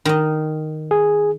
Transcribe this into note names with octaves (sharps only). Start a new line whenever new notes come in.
D#3 D#5
G#4